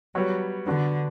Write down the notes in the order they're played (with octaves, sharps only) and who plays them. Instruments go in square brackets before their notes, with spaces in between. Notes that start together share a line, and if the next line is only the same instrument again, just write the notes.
[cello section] F#3 [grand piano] G3 B3 F#4 C#5
[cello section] D3 [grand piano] B3 D4 F#4